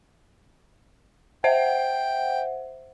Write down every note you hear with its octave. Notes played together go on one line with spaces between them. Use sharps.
C5 E5 F#5 G5